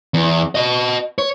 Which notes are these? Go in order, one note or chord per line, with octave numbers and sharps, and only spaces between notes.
E2
F#4 D#5
C#5